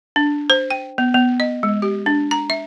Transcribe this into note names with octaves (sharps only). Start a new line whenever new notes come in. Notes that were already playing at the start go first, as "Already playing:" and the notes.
D4
C5
G5
B3
B3
D#5
G#3
G4
D4
A#5
E5